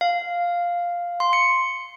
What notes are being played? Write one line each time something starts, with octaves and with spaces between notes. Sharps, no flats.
F5
C6
C#7